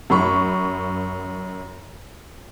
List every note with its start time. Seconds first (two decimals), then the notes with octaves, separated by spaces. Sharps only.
0.10 F#2 B5 C#6